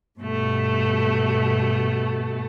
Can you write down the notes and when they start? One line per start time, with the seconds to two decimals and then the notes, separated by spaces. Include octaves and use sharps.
0.19 G2 B2 A3